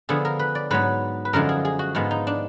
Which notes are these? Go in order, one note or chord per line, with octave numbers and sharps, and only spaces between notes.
D3 F3 B3 G#4
A#4
B4
D5
G#2 F#3 B3 B4
B4
F#2 D3 F3 G#3 A#4
G#4
G#4
F#4
G#2 F3 G#3 B3
D#4
D4